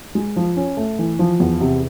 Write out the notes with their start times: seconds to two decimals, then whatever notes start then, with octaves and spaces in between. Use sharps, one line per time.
0.15 G#3
0.36 F3
0.56 C#4
0.77 A3
0.99 E3
1.19 F3
1.40 E2
1.61 C3